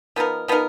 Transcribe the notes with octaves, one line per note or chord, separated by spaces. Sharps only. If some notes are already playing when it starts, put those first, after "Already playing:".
F3 B3 D#4 A#4
F3 B3 D#4 A#4